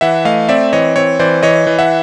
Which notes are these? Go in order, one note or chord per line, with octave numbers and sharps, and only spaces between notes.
E3 E5 F#5
A3 D#5 F5
C4 D5 E5
E3 C#5 D#5
C4 C#5
E3 C5 D5
E3 C#5 D#5
E3
E5 F#5